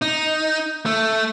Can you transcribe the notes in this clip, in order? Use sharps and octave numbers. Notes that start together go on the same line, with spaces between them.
D#4
A3